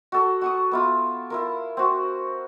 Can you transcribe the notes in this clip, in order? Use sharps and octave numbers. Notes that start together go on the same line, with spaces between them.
F#4 A4
F#4 C#6 D#6
B3 E4 F4
E4 F4 A#4
C4 F#4